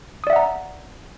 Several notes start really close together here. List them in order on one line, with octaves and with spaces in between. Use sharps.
D#6 D5 E5 F#5 A#5